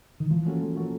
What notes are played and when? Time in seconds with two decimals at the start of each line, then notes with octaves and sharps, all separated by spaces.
0.20 D#3
0.30 E3 F3
0.46 A#3 C#4 F#4 A4
0.62 F3
0.76 A#3 C#4 F#4 A4